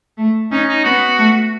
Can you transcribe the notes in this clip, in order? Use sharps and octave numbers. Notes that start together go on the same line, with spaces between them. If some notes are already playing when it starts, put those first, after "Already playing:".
A3
C#4 D#4
D#4
B3 F#4
A3